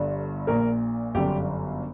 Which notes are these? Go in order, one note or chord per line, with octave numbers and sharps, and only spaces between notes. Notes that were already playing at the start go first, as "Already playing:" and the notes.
Already playing: G1 G2 D3
A#1 A#2 A#4
G1 F#2 D3 G4